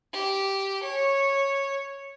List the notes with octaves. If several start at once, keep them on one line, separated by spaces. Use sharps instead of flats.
G4
C#5